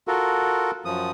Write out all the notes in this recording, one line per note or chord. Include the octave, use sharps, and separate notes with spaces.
F4 F#4 A4 A#4
F#2 F3 D#6